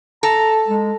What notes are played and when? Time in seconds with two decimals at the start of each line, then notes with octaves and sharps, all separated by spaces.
0.23 A4 A#5
0.68 G#3